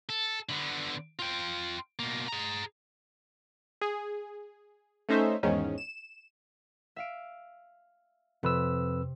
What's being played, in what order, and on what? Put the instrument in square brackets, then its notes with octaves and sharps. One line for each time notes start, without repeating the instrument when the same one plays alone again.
[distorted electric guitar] A4
D3 B3
F4 G5
B2 A#3
G#4 A#5
[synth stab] G#4
A3 C#4 D#4 C5 E5
E2 G#2 D#3 C#4
E7
[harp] E5 F5 D7
[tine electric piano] F2 B4 E6 [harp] C3